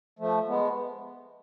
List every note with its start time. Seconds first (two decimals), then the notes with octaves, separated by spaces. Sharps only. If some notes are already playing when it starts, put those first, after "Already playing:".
0.19 F3 A3
0.48 G#3 B3